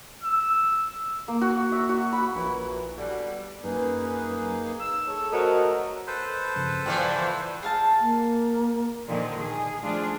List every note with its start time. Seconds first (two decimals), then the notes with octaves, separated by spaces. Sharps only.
0.23 E6
1.28 A#3
1.41 F#4
1.72 E5
1.89 F#4
2.13 B5
2.35 A#1 A#2 E3 F#3
2.98 B2 D3 G3
3.64 F#2 A#3 D#4 G#4 B4
4.80 E6
5.08 G#4 A4 C#5
5.32 F#3 A3 A#4 C5 D#5
6.07 A4 B4 C5
6.56 G2 C#3 F3
6.86 A#2 E3 F3 G5 F6
7.63 G#4 F5 A5
8.00 A#3
9.09 A#2 D3 D#3 F3
9.39 G#4
9.81 F3 G3 A3 D4 F4 G#4